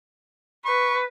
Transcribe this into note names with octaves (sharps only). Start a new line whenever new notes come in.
B4 C#6